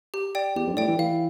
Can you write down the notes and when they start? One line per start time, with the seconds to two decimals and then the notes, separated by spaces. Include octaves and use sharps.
0.14 G4
0.35 D5 G5
0.55 E2 G4
0.67 F2
0.73 G2
0.77 A2 D5 G5
0.88 E3
0.98 E3 F5